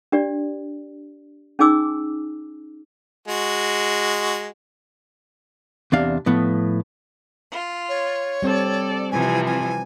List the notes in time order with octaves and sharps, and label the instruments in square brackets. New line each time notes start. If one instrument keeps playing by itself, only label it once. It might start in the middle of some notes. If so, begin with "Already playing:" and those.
[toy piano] D4 G4 D5
C#4 D#4 G#4 G#5 D6 E6
[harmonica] G#3 F#4
[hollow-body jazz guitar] E2 C3 D4 F5
A2 F3 B3
[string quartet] F4
[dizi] C#5
[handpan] G3 C4 [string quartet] A4 D5
[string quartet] C3 E3 F3 [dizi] G#5
[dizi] G#5